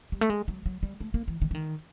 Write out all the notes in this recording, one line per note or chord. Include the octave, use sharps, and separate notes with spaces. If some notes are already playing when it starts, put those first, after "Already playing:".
G3
A3
G#3
F#3
F#3
G3
A3
A#3
E3
D#3
E3
D#3